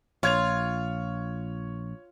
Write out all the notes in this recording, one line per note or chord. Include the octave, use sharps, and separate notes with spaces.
A#1 F4 C#5 G#6 F7